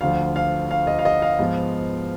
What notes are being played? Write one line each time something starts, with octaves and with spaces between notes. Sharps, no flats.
D2 D3 F3 F5
F5
F5
D#5
F5
D#5
F5
G#2 F3 B3